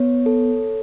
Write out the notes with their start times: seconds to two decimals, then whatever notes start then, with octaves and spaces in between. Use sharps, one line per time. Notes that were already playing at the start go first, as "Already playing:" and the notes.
Already playing: B3 C#5
0.26 A4